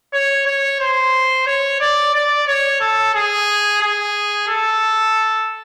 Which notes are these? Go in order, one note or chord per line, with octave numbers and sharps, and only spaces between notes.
C#5
C#5
C5
C#5
D5
D5
C#5
A4
G#4
G#4
A4